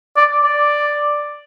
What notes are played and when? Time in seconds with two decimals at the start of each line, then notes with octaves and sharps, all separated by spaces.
0.17 D5
0.44 D5